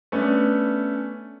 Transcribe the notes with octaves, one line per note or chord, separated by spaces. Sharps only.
A3 B3 C#4 D4